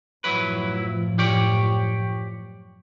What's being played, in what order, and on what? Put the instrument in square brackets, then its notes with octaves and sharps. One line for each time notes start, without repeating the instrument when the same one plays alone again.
[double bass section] F#2 A2 F3 [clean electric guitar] F#3 E4 B4
[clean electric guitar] G4 C#5 D5